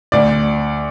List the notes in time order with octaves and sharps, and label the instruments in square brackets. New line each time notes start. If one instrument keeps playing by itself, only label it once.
[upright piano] D2 D5